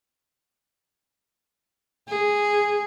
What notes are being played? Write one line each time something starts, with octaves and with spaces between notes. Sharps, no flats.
G#4